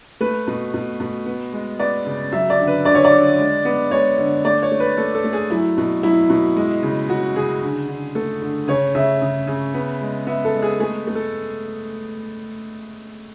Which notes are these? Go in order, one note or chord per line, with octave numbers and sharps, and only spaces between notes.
A3 B4
B2
B2
B2
B3
G#3
B3 D5
C#3
F#3 E5
D5
D3
B4
D3 D5
C#5
D5
D3
G#3
B3
G#3 C#5
D3
A3 D5
C#5
A3
B4
A3 A4
A4
A3
G#4
F#3 E4
B2
F#3 E4
B2
G#3
C#3
C#3 F#4
C#3 G#4
D3
D3
A3 A4
D3
C#3 C#5
C#3 E5
C#3
C#3
B3
G#3
B3 E5
A4
G#3
G#4
A3 G#4
A3
A4